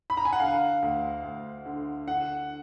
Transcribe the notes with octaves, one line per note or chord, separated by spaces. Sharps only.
B5
A#5
G#5
F#5
D3 F5
D2
D2
D3
D3 F#5